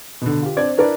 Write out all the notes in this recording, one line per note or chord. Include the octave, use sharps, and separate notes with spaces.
B2 D3
F4 G4
C4 D4 D5 G#6
D4 E4 A#4 B4 D5